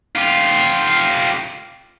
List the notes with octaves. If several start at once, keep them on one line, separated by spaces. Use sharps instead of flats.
F4 G4